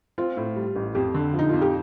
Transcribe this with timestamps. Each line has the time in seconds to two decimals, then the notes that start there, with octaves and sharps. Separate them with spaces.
0.18 C4 F4
0.37 A2
0.56 G3
0.76 A1
0.95 F2 G4
1.14 D3
1.34 F3
1.39 D#4
1.49 F2 F4
1.62 G4